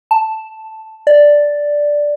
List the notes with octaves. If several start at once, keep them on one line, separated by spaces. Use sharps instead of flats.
A5
D5